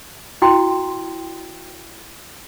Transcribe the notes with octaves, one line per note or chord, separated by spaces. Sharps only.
E4 F#4 G5 C6